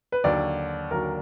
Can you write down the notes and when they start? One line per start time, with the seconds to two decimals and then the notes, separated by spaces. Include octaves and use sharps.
0.12 B4
0.24 D#2 D3 F#3 D5
0.91 D#2 D3 F#3 A#4